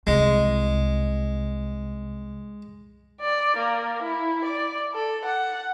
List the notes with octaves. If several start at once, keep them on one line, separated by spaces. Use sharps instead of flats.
C2 G#3
D5
A#3
E4
D5
A4
F#5